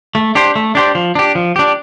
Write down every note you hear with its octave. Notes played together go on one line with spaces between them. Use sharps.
A3
D4 G4 C5
A3
D4 G4 C5
F3
D4 G4
F3
D4 G4